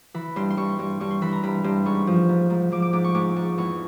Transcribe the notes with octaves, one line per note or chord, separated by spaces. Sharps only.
E3 B5
G2 C6
C6
G2 C#6
G2 C#6
G2 C#6
C6
E3 B5
A#5
G2 B5
G2 C6
G#2 C#6
F3
G#2
G#2
F3 D6
D6
G#2 D6
C#6
G#2 D6
G#2 C#6
E2 C#6